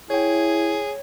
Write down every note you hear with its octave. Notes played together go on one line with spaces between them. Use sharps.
E4 G#4 C#5 G5